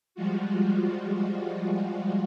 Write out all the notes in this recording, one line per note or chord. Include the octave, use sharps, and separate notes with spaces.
F3 G3 G#3 F4 F#4